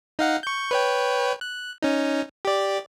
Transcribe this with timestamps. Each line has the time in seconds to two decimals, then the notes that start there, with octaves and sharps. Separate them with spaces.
0.19 D#4 F5 F#5
0.43 C#6 G6
0.71 B4 C#5 G5
1.41 F#6
1.82 C#4 D#4
2.45 G4 D5